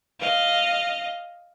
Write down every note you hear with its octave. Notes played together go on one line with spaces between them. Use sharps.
D#5 F5